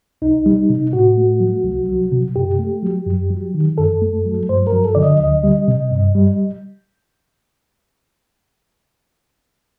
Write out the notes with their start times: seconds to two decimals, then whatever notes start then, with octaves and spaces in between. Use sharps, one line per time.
0.22 C2 D#4
0.46 G3
0.70 C3
0.93 A2 F#4
1.17 A3
1.40 F#3
1.64 C2
1.89 F#3
2.12 C3
2.36 F#2 G4
2.59 A3
2.83 F#3
3.07 F#2
3.30 F#3
3.54 D#3
3.78 F#2 A4
4.01 A3
4.25 F#3
4.49 G2 C5
4.67 A#4
4.72 F#3
4.85 A4
4.95 D3 D5
5.03 D#5
5.20 D2 D#5
5.44 G3
5.68 C3
5.91 G2
6.15 G3